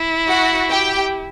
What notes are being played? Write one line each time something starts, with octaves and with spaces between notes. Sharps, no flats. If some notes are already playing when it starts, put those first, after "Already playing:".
Already playing: E4
F#4 F#5
G4 G5